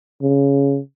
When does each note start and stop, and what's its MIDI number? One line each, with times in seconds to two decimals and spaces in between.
0.22 0.79 49